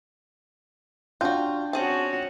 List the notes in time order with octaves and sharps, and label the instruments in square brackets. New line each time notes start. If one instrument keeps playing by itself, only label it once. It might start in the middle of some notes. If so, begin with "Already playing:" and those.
[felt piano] D4 G5 G6 [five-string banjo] F4 F#4
[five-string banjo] C4 G#4 A5 [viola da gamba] C#4 F#4